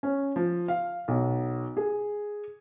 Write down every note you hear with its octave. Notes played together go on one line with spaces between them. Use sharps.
C#4
F3
F5
B1
G#4